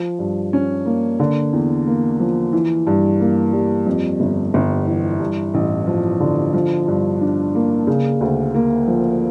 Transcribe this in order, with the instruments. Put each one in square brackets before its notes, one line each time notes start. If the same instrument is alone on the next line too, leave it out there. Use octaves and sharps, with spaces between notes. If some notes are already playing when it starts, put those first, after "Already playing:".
Already playing: [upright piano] F3
G2
C#4
A#3
D3
E2
A#3
F3
E3
G2
A#3
G3
F2
G1
G1
E3
G2
A1
F3
D3
F3
G2
D4
A#3
C#3
D2
A#3
F3